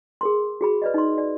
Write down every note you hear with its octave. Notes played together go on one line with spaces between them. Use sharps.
G#4 A#4 C6
F#4 G#4 B5
B4 D5 D#5
D#4 C6
D5